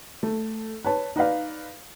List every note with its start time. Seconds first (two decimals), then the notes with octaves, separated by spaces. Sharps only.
0.23 A3
0.84 B4 C#5 A5
1.16 D#4 B4 D5 F5